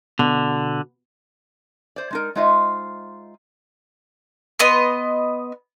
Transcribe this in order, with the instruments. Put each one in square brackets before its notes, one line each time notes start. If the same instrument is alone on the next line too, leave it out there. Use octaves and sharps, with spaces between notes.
[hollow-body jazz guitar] B2 [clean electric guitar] D3
[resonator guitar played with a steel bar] C5 D5
G#3 D#4 A#4
G#3 D#4 F4 C5 D#5 E5
[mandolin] B3 D#5 C6